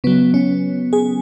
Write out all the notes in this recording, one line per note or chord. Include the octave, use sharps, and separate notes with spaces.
C#3 F#3 B3
C#4
G#4